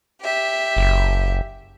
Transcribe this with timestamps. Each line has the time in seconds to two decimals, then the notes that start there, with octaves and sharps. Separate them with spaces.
0.20 G4 E5
0.77 F#1